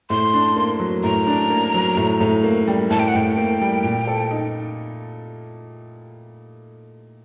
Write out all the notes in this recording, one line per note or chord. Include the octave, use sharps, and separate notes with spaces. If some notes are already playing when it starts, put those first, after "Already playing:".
A2 C6
D4
A#3
F#3
A2 A#5
D4
A#3
F#3
A2
A2
A#3
G3
A2 A5
G5
F#5
A2 G5
A#3
G3
A#2
A4
D#4